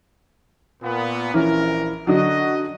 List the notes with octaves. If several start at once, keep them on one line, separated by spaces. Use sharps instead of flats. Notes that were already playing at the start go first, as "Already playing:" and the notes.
A#2 B3
A#1 E3 C#4 E4 A#4
D3 F#3 F#4 D#5